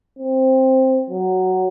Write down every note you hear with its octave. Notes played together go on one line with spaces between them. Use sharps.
C4
F#3